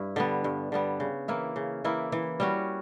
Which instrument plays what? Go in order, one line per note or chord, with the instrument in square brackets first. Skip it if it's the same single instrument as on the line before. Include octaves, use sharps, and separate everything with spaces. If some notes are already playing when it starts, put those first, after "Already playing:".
Already playing: [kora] G2 E4
D3 G3 B3
G2
D3 G3 B3
C#3
E3 A#3 E4
C#3
E3 A#3 E4
E3
G3 C#4 F#4